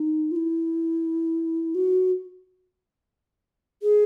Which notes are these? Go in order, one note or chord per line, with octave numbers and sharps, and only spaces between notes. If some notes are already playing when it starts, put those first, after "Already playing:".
Already playing: D#4
F4
E4
F#4
G#4